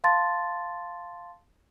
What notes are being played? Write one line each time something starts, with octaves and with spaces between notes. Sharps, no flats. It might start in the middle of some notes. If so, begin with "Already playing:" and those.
F5 A5 C6 A6